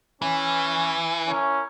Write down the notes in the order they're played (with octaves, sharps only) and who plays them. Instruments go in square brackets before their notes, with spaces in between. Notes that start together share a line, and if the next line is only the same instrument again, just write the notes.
[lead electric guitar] E3 [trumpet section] C#4
[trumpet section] C#4 E4 A#4